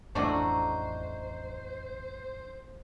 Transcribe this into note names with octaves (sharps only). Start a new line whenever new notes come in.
A1 F2 A3 D4 F#4 C5 D#5 A#5